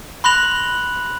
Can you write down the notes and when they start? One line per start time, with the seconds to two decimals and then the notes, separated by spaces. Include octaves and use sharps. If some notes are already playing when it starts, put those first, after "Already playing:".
0.24 B5 C6 F#6 A#6 F7 F#7